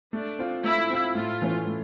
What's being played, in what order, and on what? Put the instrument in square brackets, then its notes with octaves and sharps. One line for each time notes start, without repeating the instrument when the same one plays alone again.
[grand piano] A3 [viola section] D4
[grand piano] C4 F4
[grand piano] A3 [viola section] E4
[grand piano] C4 F4
[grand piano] A2 [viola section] F4
[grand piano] E3 A3 C#4
A2